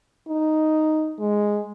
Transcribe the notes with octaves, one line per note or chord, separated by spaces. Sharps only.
D#4
G#3